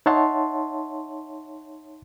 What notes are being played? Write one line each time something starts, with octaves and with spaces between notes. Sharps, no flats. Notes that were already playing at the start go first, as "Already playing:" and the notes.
D#4 C#5 E5 F#5 A5 C6